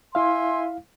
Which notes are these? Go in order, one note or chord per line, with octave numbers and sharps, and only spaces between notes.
E4 E5 F5 G#5 C6